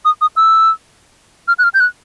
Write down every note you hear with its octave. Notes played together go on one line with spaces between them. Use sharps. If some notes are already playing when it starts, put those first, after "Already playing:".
D#6
D#6
E6
F6
F#6
F6
G6
F#6